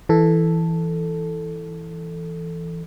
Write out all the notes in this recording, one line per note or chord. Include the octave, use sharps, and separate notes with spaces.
E3 A4